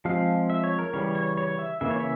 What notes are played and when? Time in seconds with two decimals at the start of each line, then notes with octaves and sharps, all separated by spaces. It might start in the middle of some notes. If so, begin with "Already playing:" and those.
0.05 F3 G#3 C4 F5
0.50 E5
0.64 C#5
0.79 A#4
0.93 C#3 E3 G3 C#5
1.15 C#5
1.38 C#5
1.59 E5
1.81 C#3 E3 A#3 C#4 E5
1.90 C#5
2.00 E5